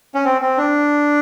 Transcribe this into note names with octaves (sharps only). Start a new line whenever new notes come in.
C#4
C4
C4
D4